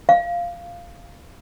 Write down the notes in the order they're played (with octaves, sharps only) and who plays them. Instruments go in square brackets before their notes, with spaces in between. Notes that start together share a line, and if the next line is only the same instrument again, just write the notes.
[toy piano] F5